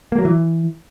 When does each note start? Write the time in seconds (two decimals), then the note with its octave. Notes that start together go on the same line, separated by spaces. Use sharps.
0.12 A#3
0.19 F#3
0.25 E3